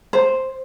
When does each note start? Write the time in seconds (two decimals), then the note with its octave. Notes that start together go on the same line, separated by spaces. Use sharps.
0.13 C5